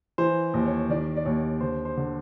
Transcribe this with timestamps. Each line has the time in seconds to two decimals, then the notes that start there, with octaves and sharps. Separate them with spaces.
0.18 E3 C5
0.54 D#2
0.66 C#5
0.89 D#3 D5
1.16 D5
1.26 D#2 C#5
1.61 D3 C5
1.85 C5
1.97 D3